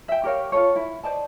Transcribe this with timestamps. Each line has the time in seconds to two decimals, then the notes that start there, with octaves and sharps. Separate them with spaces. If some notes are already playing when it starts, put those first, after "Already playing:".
0.08 E5 G5
0.24 G4 A#4 C#5 F5
0.52 F4 F#4 A4 C#5
0.76 E4
1.03 C5 D5 D#5 A5